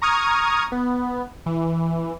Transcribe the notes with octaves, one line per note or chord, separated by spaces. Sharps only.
A#5 C#6 D#6 F6 G#6
B3
E3